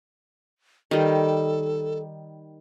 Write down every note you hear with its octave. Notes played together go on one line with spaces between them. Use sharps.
D#3 G3 A4